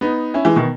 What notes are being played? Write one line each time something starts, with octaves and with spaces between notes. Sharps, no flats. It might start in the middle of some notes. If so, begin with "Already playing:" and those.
B3 D#4
C#4 E4
E3 G#3
B2 D#3